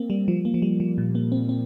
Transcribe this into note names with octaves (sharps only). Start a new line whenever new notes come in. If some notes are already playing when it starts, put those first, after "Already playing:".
Already playing: A#3 C4
G3
F3
A#3
F3
G3
F3
A#2
A#3
C4
C4